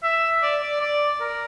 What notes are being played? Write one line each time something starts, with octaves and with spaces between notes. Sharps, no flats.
E5
D5
D5
D5
A#4